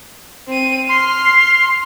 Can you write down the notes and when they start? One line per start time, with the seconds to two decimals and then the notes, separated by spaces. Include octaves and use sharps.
0.48 C4 D#7
0.89 C6 F6 C7